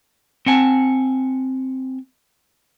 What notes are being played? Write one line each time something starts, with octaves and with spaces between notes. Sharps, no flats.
C4 F#5 G#5 A5